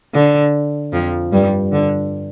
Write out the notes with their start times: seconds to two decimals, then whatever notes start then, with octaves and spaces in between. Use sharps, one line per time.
0.14 D3
0.93 F2 F3
1.32 G2 G3
1.72 D3